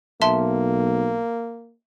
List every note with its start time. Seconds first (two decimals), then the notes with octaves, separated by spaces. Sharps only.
0.22 B1 A#3 E5 A5 C6